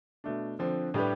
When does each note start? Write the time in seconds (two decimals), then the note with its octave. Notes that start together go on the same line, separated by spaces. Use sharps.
0.24 B2 A3 D4
0.59 D3 F3 C4
0.94 A2 G3 D4 G4 B4